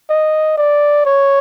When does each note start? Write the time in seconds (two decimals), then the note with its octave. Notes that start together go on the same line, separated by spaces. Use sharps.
0.10 D#5
0.58 D5
1.06 C#5